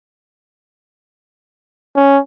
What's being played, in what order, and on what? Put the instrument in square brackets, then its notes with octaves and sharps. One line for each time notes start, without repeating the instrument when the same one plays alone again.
[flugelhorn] C#4